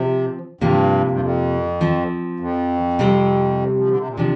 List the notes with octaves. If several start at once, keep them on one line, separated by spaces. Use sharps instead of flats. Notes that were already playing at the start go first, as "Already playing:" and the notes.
Already playing: C3 F3 C4
G2 C3 F3 A#3
G2
F2
F3 C4
F2
C3 G3 C4
F3
D3
C3
A#2
C3 F3 D4